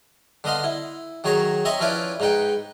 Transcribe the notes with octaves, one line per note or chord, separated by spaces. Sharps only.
D3 B3 D#5 F5 C6
E4
D#3 F#3 G#4 C#5 A#5
C4 D#5 E5 A#5 C#6
F3 C#4 E4 B4 D5 F5
G#2 D#4 B4 G5